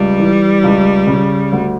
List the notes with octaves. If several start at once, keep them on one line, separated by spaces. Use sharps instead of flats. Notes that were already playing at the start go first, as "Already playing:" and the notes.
Already playing: C#2 G3
E3
C#2
C#3
D2